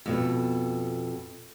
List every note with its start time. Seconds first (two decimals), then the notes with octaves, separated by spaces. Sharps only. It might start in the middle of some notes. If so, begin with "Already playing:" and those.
0.06 F2 B2 A4